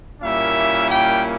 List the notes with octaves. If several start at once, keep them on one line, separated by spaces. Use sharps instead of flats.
A#2 G3 A#3 C#4 E4 E5
G5